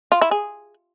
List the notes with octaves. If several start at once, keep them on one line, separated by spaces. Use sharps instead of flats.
F4
E4
G#4